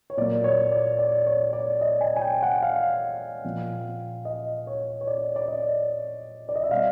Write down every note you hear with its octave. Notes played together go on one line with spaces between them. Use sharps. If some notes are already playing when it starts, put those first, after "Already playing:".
C#5
A#2 F#3 A#3 D5
C#5
D5
D5
C#5
D5
D#5
G#5
G#5
G5
F#5
F5
A#2 F3 A#3
D#5
C#5
C#5
D5
D5
D#5
D5
D#5
E5
B2 G3 C4 F5